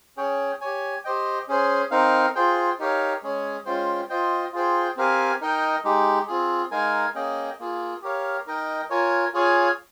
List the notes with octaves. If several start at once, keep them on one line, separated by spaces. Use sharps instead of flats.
C#4 G#4 C#5 G5
G4 C#5 G#5
G4 C5 D#5 G5
C#4 G#4 C5
C4 D#4 A#4 F5
F4 G#4 C5 G5
D#4 G4 A#4 C#5 F5
G#3 C#4 G#4 C#5
G#3 C#4 F4 C5 G5
F4 C5 D#5 G5
F4 G#4 C5 G5
C4 G4 A#4 F5 G#5
D#4 A#4 D#5 G5
G#3 D#4 G4
C4 F4 G#4
G#3 D#4 A#4 F5 G#5
A#3 C#4 G#4 D#5 G5
A#3 F4 G#4
G4 A#4 C#5 F5
D#4 A#4 D#5 G5
F4 A#4 C#5 G#5
F4 G#4 C#5 F5 G#5